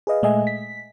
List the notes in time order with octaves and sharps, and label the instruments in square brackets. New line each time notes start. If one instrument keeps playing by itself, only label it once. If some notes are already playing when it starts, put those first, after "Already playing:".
[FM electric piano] G#4 B4 D#5 F5
A#2 G#3 A3 D#5 E5 G#5
B6